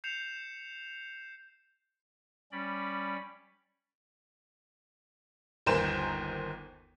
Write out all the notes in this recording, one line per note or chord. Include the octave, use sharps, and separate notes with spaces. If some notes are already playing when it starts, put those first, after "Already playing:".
G6 C7 C#7 E7 F7
G3 C#4 D5 B5
G1 D#2 A#4 C5 G#5 E7